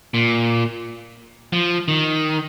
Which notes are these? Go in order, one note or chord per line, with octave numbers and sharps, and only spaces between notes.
A#2
F3
D#3